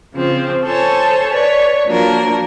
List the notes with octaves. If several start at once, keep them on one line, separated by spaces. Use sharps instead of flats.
C#3 F3 C4
A4 C5 C#5 G#5 A5
B4 C#5 D5
F3 F#3 A#3 D4 F#4 A#4